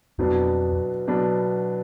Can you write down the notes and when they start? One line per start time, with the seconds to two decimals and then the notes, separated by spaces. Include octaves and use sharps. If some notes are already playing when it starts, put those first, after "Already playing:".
0.18 F2 B2 F#3 B3 D4
1.08 B2 F#3 B3 D4